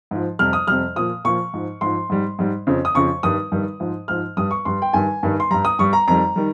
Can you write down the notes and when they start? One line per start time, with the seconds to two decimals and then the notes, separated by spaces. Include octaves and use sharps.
0.11 G#2 F3
0.39 F2 C3 G3 F6
0.53 D#6
0.67 F2 C3 G3 F6
0.96 A#2 F3 D#6
1.25 A#2 F3 C#6
1.53 G#2 F3
1.81 G#2 F3 C6
2.10 G#2 G3
2.39 G#2 G3
2.67 F2 C#3 F3
2.85 D#6
2.95 F2 C#3 F3 C#6
3.23 G2 D#3 G3 D#6
3.52 G2 D#3 G3
3.80 G#2 F3
4.08 G#2 F3 F6
4.37 G2 G3 D#6
4.51 C#6
4.65 G2 G3 C6
4.82 G5
4.93 G2 D#3 G3 G#5
5.23 G2 D#3 G3
5.40 C6
5.51 G2 G3 A#5
5.65 D#6
5.79 G2 G3 C#6
5.93 A#5
6.07 F2 D#3 G3 A#5
6.36 D#3 G3